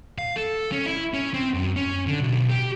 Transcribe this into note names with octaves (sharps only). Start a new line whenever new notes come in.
F5
A4
C#4
E4
C#4
C4
F#2
C#4
D3
B1
G4